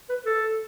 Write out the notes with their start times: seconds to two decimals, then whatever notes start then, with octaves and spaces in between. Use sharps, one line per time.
0.09 B4
0.26 A4